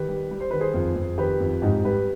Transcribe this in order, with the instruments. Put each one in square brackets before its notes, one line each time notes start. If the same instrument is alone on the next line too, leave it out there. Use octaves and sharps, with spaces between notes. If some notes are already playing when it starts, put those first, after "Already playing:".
Already playing: [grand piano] D#3 G4 B4
G3
G3
C5
D#3 B4
G#4 C5
F2
F2
D#3 G4 B4
F2
G#2 D#4 G4
G3 G4 B4